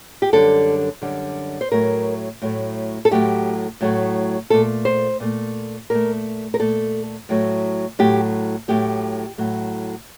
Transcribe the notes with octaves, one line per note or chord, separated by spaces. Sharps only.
G4
F#2 D3 G3 A4
F#2 D3 G3
C5
A2 F#3 A3 A#4
A2 F#3 A3
A4
A2 F#3 A3 G4
A2 F#3 A3
A#2 A3 A4
C5
A#2 A3
A#2 A3 A#4
A#4
A#2 A3 A4
A2 F#3 A3
A2 F#3 A3 G4
A2 F#3 A3 G4
A2 F#3 A3